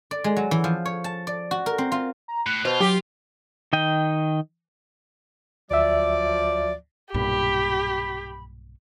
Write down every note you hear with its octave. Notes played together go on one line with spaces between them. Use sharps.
D5
G#3
F#3
E3
F3
C#5
A5
D5
F#4
A#4
C4
F4
A#5
A2 F#6
B2 F4 C5
F#3 G4
D#3 D#5 G5
D2 F3 F#3 D5 E5
B1 G2 A#2 G4 B5